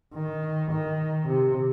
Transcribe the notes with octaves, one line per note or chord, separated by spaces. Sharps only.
D#3
D#3
C3